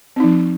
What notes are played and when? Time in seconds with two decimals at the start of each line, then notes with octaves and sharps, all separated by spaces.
0.16 C4
0.20 D#4
0.24 F3